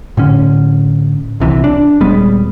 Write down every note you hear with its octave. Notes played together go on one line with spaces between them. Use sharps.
A2 D3 C#4
C2 C3 E3
D4
D#1 G3 G#3 B3